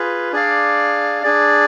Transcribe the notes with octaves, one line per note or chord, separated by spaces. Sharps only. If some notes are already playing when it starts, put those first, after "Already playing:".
Already playing: F4 G#4 B4
D4 G#4 D5 F5
D4 G#4 D5